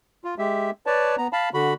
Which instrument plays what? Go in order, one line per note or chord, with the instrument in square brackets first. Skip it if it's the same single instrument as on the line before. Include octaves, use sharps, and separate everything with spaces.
[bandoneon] F4
G#3 G4 E5
B4 C#5 D5 A5
B3 A#5
F5 A5 B5
D3 F#4 B5